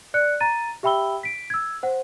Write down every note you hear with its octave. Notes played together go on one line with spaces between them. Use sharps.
D5 F#6 C#7
A#5 A6 D#7
G4 E5 G5 B5 E6 G7
B6 D7
E6 G#6
C5 F#5